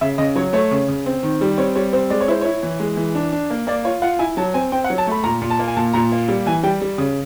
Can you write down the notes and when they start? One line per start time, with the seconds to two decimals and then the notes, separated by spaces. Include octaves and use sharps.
0.01 C#3 E5
0.18 C#3 D#5
0.36 F#3 C#5
0.53 A3 C#5
0.71 C#3
0.88 C#3
1.06 C4
1.23 D#3
1.41 G3
1.58 C4 C#5
1.76 G3 C#5
1.93 C4 C5
2.10 G#3 D5
2.21 C#5
2.28 E4 C5
2.41 E4 C#5
2.63 E3
2.80 G#3
2.97 E3
3.15 D4
3.32 D4
3.50 A#3
3.67 A#3 D5
3.84 F4 C#5
4.02 F4 F#5
4.19 E4 G#5
4.37 F#3 A5
4.54 C4 G#5
4.72 C4 G5
4.84 F#5
4.90 F#3
4.98 A5
5.07 A3 B5
5.24 A#2 A#5
5.42 A#2
5.50 A5
5.59 A#3
5.68 G#5
5.76 A#2 A5
5.94 A#2 A#5
6.12 A#3
6.28 G3
6.46 E3 G#5
6.63 G3 G5
6.82 G3
6.98 C#3